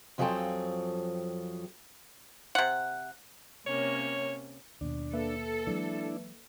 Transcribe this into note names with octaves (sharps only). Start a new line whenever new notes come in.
F2 F3 F#3 G#4 A4 G5
C3 F#5
C3 A#3 C#4 C#5
D#2 B2 D4
A#3 A4 B4 E5
E3 F#3 G#3 D4 E4